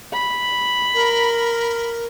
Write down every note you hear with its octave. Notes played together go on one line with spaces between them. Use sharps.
B5
A#4